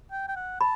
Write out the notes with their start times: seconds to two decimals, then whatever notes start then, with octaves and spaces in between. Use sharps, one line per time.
0.11 G5
0.28 G5
0.36 F#5
0.61 A5 B5